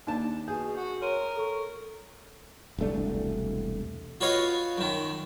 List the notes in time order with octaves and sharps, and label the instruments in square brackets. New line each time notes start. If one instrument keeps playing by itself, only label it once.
[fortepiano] D#2 D4 A5
[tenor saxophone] B2 [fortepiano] G#4 [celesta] G6
[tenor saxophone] F#4
[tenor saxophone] A#4 [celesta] C#5 C6 D#7
[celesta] A4 C#6
[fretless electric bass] E1 C2 A3 D4
[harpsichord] F4 F#4 B4 C#5 D#5 F5
F#2 D#3